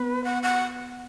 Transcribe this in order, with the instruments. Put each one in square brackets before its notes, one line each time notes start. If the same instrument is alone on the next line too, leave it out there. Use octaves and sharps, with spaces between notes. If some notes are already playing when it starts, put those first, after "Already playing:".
Already playing: [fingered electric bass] B3 [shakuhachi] B4
[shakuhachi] F#5
F#5